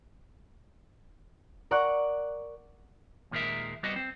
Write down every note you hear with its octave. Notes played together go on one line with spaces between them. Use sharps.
A#4 D5 F#5 C#6 D6 F#6
D#2 A#2 D#3 G#3 A#4 E5
G3 B3 C4 F#4 D#5
C4